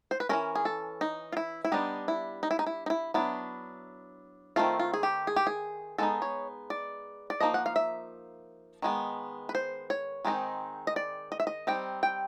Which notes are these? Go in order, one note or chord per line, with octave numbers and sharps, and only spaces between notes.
C5
B4
E3 G#3 C#4 A#4
G#4
A4
D#4
F4
E4
E4
G3 B3 D4 D#4
E4
D#4
E4
D#4
E4
D#4
E4
F#3 B3 D4 E4
D#3 F#3 A3 C4 F4
F4
G#4
G4
G#4
G4
G#4
G#3 B3 D#4 A4
C#5
D5
D5
F3 A#3 D#4 D#5
F#5
F5
E5
D#3 G#3 B3
B4
C5
C#5
D#3 G#3 C4 D#4
D#5
D5
D#5
E5
D#5
G3 C4 D#4 G5
G5